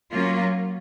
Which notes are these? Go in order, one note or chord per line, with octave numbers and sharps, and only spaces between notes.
F#3 A#3 C#4 F4